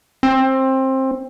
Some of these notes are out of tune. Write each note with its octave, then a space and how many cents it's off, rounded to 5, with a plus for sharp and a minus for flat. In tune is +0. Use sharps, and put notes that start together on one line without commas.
C4 +20